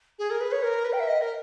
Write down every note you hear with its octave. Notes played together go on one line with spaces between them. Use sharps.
G#4
A#4
B4
C#5
A#4
B4
G5
E5
D#5
A#4